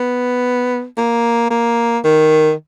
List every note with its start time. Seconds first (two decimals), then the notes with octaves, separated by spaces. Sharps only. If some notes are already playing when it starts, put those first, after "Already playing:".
Already playing: B3
0.97 A#3
1.51 A#3
2.04 D#3